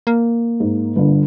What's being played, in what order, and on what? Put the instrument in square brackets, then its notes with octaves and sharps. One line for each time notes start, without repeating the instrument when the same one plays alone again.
[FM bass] A#3
[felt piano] G#2
G1 D3